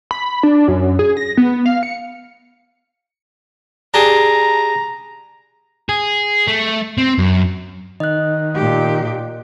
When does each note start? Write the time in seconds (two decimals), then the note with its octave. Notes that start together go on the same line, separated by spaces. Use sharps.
0.11 B5
0.43 D4
0.68 F#2
0.99 G#4
1.17 A#6
1.37 B3
1.66 F5
1.83 C#7
3.94 D4 G4 G#4 A#5
5.89 G#4
6.47 A3
6.98 C4
7.18 F#2
8.00 D#3 D#5 F#6
8.55 A#2 G4